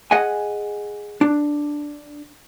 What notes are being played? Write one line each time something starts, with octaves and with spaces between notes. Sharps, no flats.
G#4 D#5 F#5 G#5
D4